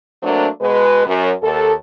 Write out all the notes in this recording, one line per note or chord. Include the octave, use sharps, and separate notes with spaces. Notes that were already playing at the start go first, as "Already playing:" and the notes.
F#3 A3 A#3 C4 D4
B2 G#3 B4
F#2
D#2 A4